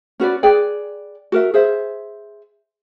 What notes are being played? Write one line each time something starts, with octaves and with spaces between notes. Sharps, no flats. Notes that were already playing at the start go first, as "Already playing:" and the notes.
C#4 F#4 B4 D5
G#4 B4 D5 G5
F#4 A#4 E5
G#4 C5 E5